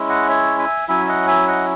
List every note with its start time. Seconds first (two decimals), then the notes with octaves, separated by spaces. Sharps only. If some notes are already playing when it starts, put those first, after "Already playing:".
Already playing: G#3 C#4 E4
0.09 D#5 F#5
0.29 C#5 E5
0.59 E5 G#5
0.88 F#3 C#4 E4 E5 G#5
1.08 D#5 F#5
1.28 E5 G#5
1.47 D#5 F#5